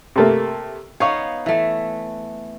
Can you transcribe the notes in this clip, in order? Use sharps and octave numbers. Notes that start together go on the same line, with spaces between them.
C3 A3 A#3
B3 D#4 C#5 F5 C#6
E3 A3